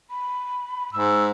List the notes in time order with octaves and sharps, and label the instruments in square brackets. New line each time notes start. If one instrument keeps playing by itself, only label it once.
[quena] B5
[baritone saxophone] G#2 [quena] E6